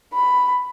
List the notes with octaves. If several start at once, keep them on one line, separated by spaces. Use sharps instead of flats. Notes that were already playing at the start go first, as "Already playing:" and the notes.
B5